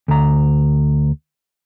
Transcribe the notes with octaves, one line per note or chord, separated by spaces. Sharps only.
D2 A#5